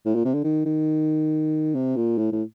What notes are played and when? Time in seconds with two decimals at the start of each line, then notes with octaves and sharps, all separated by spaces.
0.06 A2
0.15 A#2
0.25 C3
0.34 D3
0.44 D#3
0.66 D#3
1.75 C3
1.96 A#2
2.18 A2
2.32 A2